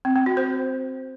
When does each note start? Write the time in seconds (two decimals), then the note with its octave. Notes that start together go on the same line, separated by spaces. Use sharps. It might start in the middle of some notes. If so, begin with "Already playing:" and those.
0.05 C4
0.16 C4
0.26 F#4
0.37 C5